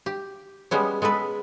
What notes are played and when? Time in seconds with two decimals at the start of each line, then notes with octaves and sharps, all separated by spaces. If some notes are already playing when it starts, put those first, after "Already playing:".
0.06 G4
0.71 G3 G#3 B3 C#4
1.02 G#3 B3 A4 B4